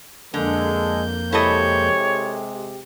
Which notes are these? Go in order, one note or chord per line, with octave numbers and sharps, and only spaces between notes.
F2 D3 G#3 A#3 A4 G6
C3 G#3 E4 G4 A4 C#5 D#5